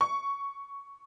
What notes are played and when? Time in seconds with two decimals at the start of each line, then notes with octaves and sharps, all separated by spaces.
0.01 C#6